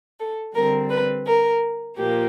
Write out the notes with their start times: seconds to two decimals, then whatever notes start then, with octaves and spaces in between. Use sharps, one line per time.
0.20 A4
0.55 D3 G3 C4 A#4
0.90 B4
1.27 A#4
1.97 A#2 F3 A#3 G4